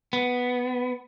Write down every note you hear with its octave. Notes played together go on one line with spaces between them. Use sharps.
B3